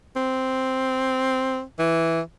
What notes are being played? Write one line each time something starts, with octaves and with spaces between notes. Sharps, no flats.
C4
E3